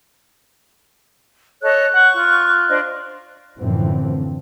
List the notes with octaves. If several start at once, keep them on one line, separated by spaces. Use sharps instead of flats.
A4 C#5 D#5 F#6
F#5 C#6
F4
D4 C5 D#5
F#2 A2 D3 E3 F3 C4